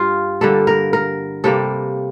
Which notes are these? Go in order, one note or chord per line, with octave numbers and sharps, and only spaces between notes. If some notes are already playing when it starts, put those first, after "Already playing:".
Already playing: G2 F4 G4
D3 G3 A#3 A4
A#4
A#4
C3 G3 A#3 A4